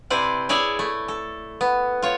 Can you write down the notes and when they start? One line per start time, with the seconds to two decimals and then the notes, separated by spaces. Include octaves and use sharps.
0.10 C3 E4 B4 C5 D5
0.49 E4 G#4 C#5 D5 E5
0.79 A3
1.08 A4
1.61 B3
2.02 F4 C#5